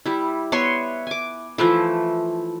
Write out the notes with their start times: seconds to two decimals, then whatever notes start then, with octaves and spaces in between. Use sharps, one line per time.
0.06 G3 E4
0.52 B3 C#5 E5 C6
1.07 G#5 D6
1.58 E3 F3 A3 E4